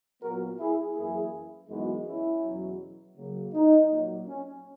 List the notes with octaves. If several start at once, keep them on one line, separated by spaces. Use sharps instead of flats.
A#2 F#3 B3 F#4 A#4
E4 G#4
F#2 E3 A#3 E4 G#4
F#2 E3 G#3 B3 D#4 F#4
C#4 E4
E2 B2 F#3
C#3 F#3 A#3
D#4
A#2 F#3 A#3
C#4